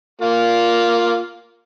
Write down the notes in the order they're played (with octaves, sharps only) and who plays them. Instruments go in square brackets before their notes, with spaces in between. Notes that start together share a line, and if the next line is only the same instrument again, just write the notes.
[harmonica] A#3 F4